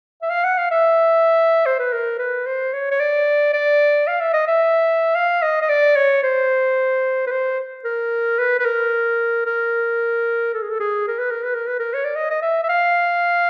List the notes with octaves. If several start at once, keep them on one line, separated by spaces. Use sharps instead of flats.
E5
F5
F#5
F5
E5
C5
B4
A#4
B4
C5
C#5
C#5
D5
D5
F5
E5
D#5
E5
F5
D#5
D#5
D5
C#5
C5
B4
C5
A#4
B4
B4
A#4
A#4
A4
G#4
A4
G#4
A#4
B4
A#4
B4
A#4
B4
A#4
C#5
D5
D#5
D#5
E5
E5
F5